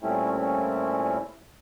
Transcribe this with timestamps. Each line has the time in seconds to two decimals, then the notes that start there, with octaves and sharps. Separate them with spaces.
0.02 A#2 G3 A3 C4 C#4 E4